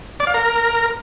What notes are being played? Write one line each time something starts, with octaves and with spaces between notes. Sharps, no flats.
D5
F5
A#4